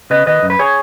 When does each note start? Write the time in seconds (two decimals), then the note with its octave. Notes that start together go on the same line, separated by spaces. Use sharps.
0.10 C#3 B4 D#5
0.26 D#3 B4 D#5
0.43 F#2
0.50 B4
0.59 G#4 C#5